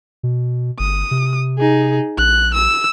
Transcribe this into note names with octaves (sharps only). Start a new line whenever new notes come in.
B2
G1 D#6
C3
D#4 G#4
A#1 F#6
E6